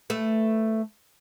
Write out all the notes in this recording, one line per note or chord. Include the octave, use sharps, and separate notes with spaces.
A3 B4